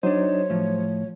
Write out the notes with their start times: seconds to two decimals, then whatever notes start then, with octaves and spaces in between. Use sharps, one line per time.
0.03 F#3 D4 D#4 C5 C#5
0.50 A2 F3